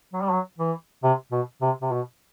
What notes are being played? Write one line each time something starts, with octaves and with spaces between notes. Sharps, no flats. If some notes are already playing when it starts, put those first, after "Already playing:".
F#3
G3
F#3
E3
C3
B2
C3
C3
B2